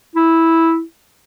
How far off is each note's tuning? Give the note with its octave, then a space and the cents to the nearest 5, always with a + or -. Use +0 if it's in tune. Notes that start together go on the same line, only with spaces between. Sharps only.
E4 -10